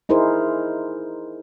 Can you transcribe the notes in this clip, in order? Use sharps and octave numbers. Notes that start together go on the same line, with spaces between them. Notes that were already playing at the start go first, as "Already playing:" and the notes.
D#4 E4 G#4 A#4 C5